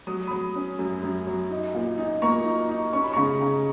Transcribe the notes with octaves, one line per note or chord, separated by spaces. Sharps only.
F#3 D#6
F#3 B5 D#6
C#4
F#2
F#2
F#3
D#4
A#2
D#4
A#3 A#5 C#6
D#4
D#4
C#4 C#6
B5
C#3 A#5 C#6
C#3